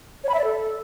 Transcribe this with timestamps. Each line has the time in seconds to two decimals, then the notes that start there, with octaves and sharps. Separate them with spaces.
0.24 C#5
0.29 B5
0.34 E5
0.39 D5
0.44 A4